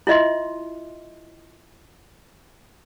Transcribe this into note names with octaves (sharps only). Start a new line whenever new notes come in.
E4 F4 D#5 E5 C6